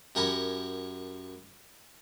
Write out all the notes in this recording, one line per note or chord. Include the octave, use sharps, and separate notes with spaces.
F#2 G4 A#4 F#5 G#5 B5